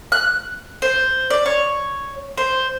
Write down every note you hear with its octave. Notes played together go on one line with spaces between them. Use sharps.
F#6
C5
D5
C#5
C5